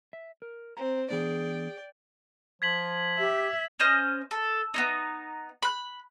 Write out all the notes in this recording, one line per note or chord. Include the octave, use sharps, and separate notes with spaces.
E5
A#4
C4 A#5
E3 B3 D4 G#4 D5 G5
F3 G#6 B6 F#7
G4 E5
C#4 C5 D#5 F6
A4
B3 C#4 D#4
B5 F#6